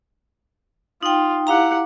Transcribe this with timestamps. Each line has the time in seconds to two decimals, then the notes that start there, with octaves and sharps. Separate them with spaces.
1.03 D#4 F4 G5
1.47 E4 G4 F5 F#5 A#5